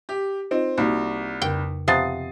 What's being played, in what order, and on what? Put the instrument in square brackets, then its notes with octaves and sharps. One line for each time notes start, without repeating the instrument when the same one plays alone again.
[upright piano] G4
[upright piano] C4 [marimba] D#4 F4 D#5
[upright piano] C2 [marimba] A#3 D#4 F#4
[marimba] F2 C#3 A#4 [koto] G5
[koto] C3 F3 B3 [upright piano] D#6 A6 C7